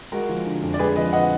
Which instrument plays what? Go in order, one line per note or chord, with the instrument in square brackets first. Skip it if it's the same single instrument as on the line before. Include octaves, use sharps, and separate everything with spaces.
[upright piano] G#3 [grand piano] F#4 A#4
[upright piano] F3
D3
F2
[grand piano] D5
[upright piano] G#3 [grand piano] G#4 B4
[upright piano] F3 [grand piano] B4 D#5
[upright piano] D3 [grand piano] D#5 F#5